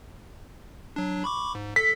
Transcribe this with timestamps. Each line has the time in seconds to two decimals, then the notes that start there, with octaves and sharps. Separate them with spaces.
0.96 F#3 D4
1.24 B5 C#6 D6
1.55 G#2
1.76 A4 B6